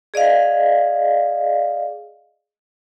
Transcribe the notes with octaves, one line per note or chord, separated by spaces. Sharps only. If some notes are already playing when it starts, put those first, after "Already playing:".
G#4 D5 D#5 F5